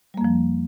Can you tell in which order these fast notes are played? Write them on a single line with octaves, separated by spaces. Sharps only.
G3 A#3 F2 F3